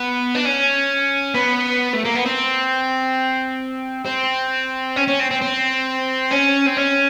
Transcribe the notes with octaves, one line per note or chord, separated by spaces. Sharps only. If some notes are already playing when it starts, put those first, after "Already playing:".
Already playing: B3
D4
C#4
B3
A3
A#3
B3
C4
C4
C#4
C#4
C4
C4
C4
C#4
C4
C#4